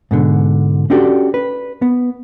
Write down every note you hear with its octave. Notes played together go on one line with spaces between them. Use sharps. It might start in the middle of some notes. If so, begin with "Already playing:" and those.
G#2 B2 D3
C#4 D4 F#4 G4 A4 D5
B4
B3